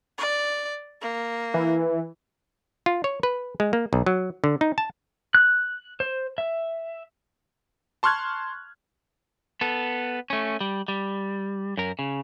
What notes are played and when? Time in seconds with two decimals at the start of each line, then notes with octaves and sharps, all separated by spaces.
0.18 D5
1.01 A#3
1.54 E3
2.86 F4
3.04 C#5
3.23 B4
3.60 G#3
3.73 A#3
3.93 B1
4.06 F#3
4.44 D3
4.61 D#4
4.78 A5
5.35 F#6
6.00 C5
6.38 E5
8.03 A5 C6 C#6 F6 F#6 G#6
9.61 B3 A4
10.30 A3 C#4
10.61 G3
10.88 G3
11.77 F#2 A#4
11.99 C#3